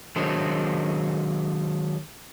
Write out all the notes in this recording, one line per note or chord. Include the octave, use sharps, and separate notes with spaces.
D#3 F#3 G#3 D4 C5